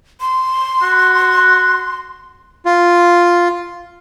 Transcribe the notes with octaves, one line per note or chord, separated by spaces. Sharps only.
C6
F#4
F4